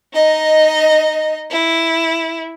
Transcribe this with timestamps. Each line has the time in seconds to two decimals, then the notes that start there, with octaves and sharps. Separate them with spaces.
0.14 D#4 D#5
1.51 E4